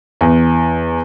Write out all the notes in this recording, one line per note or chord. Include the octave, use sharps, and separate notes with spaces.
E2